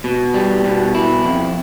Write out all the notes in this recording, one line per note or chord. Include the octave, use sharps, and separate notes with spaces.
B2
G3
B2
E4
F2